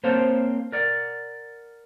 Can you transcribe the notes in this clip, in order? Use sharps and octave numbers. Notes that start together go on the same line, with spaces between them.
A#3 C4 C5 C#5 F5 A5
A#4 D5 F#5